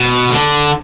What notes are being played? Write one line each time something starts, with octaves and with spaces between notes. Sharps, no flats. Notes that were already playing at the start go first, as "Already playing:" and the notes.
Already playing: B2
D3